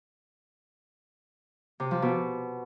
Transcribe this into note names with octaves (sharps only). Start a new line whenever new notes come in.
C3
F3
B2